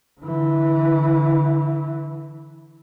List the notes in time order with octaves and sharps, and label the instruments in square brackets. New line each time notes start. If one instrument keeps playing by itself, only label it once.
[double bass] D3 E3